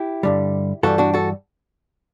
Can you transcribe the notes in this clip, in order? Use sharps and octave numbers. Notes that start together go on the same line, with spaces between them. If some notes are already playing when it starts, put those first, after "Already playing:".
Already playing: E4 G4
G2 D3 G3
G2 E3 G3 F#4 A4
D4 F#4
F#4 A4